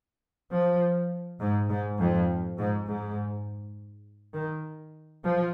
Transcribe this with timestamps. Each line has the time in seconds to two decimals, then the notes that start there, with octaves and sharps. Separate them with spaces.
0.51 F3
1.40 G#2
1.70 G#2
1.99 F2
2.58 G#2
2.87 G#2
4.34 D#3
5.23 F3